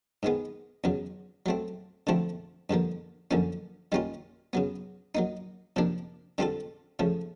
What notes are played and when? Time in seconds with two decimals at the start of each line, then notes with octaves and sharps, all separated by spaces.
0.23 G#2 D#3 G#3 B3
0.84 E2 C#3 F#3
1.46 F#3 A3 C4
2.07 D3 F3 A3 C4 E4
2.70 G2 D3 F3 A#3
3.31 F#2 D3 F3 A#3 C#4
3.92 D#3 G3 A#3 C#4 F4
4.53 C#3 F#3 B3
5.15 F#3 A#3 D#4
5.76 C3 F3 A#3 D4
6.38 D3 G3 C4 F4 A4
6.99 C#3 F3 A3